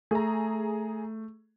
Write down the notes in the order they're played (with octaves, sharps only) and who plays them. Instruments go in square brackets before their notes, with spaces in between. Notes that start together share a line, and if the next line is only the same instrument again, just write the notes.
[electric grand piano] A3 [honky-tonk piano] G#4 A#5